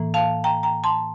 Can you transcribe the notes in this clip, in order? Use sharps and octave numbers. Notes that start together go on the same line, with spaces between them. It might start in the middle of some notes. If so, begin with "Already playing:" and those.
Already playing: A2 E3 A#3
F5 A5
G5 A#5
G5 A#5
A5 C6